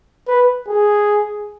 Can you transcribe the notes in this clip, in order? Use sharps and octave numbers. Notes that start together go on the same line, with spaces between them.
B4
G#4